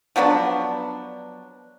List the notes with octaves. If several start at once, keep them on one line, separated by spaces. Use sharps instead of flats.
F3 F#3 B3 D4